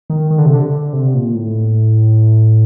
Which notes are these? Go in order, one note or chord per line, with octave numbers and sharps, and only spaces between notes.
D#3
D#3
D3
C3
D3
C3
A#2
A2